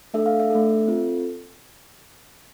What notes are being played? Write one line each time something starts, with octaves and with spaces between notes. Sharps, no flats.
A3 D4 A4 E5
F5
E5
A3 D4 A4
C4 F4 A4